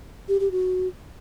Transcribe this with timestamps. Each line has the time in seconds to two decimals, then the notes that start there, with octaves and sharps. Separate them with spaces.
0.29 G4
0.40 G4
0.51 F#4